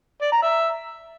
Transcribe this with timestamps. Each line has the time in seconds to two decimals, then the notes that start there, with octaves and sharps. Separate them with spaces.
0.21 D5
0.32 A#5
0.42 E5